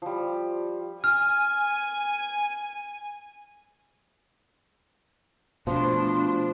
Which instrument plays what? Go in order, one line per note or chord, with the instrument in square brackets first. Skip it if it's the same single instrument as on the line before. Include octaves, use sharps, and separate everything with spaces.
[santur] F3 G3
[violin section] G#5 [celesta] F6
[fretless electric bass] B2 [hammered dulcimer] F3 [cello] A3 D4 [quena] C6